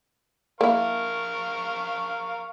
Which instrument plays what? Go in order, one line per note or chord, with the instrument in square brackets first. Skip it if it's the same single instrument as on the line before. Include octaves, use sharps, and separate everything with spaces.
[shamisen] A#3 E4 [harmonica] A#4 F5 C#6